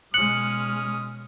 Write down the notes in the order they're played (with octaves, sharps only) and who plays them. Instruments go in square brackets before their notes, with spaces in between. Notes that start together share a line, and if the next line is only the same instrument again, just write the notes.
[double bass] B2 G#3 [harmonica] C#4 D#6 F6 [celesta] F#6 C#7 F#7